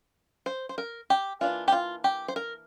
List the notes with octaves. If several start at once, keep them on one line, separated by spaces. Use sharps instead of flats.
C5
C5
A#4
G4
E3 A#3 D4 F4
G4
F4
G4
C5
A#4